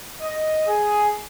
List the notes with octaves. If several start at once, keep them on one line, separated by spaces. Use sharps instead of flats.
D#5
G#4